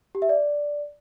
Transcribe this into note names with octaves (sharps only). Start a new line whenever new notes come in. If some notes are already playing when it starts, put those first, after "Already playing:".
G4
E5
D5